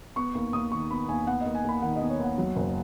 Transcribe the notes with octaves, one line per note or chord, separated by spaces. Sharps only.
B3 C#6
D#2
D#2 D#6
D#3 C#6
B3 B5
D#2 G#5
B3 F#5
D#2 D#5
G#5
D#2 B5
D#3 F#5
B3 D#5
C#5
D#2 F#5
F#3
F#1